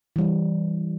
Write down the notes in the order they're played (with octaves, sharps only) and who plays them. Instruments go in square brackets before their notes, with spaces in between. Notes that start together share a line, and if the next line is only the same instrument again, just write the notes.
[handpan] E3 G3